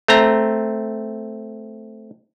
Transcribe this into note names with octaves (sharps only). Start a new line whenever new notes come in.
A3 C4 A#5